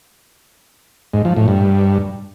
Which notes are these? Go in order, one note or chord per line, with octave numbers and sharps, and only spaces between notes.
G#2
F3
A2
G2